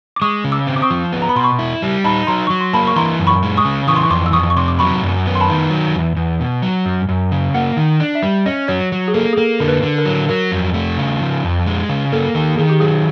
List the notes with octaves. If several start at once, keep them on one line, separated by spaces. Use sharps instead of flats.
D6
G#3 C#6 D#6
C#3
D6 E6
C4
D6
C#6 D#6
F3
B3
A#5
B5
B2 C6
B5 C#6
E4
G3
D#4 A5 B5
F#3 A#5 C6
F#3 C#6
C6
A#3 A5 B5
C#6
E3 A#5 C6
F#2
B5 C#6
G#3
C#6 D#6
C#3
E3 C#6 D#6
C6
C#6
F2 C6 D6
E6
F2 C#6 D#6
C#6
C3 C6 D6
D6
F#3 B5 C#6
F#2
B3
C6
A5 B5
D#3
F#3
E2
E2
B2
F#3
F#2
F#2
C#3
A#3 F#5
D#3
D4
E5
G3
C#4 D#5
F#3 C#5
F#3
G#4
A#3 A4
G#4
A#3 A4
D3 A#4
B4
D3
A#4
F#3
F#3 A#4
F2
A3
C#3
F3
F2
G#3
C#3
A#3 A4
D#3
D#3 G#4
G4
F#3 G#4